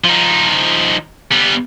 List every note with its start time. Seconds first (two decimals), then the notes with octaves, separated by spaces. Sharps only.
0.04 F3 D#4
1.31 G3 B3